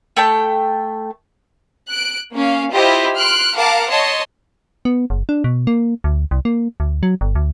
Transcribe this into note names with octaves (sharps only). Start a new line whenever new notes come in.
A3 G5 A5
F#6 D7
A#3 C#4 F5
E4 F4 G4 C5 D#5
C6 F6 F#6 D7
A#4 F5 F#5 A5 D6
C#5 D#5 A5 C6
B3
F#1
D4
B2
A#3
D2
C2
A#3
D2
F#3
G1
D2